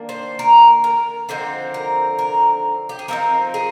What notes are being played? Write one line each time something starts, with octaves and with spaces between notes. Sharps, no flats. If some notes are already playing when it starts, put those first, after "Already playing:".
Already playing: D#3 A#3 D4
C5
A#4
A#4
D3 F3 C4 D#4 C5
A#4
A#4
G4
G#4
F3 C4 D#4 A#4
G#4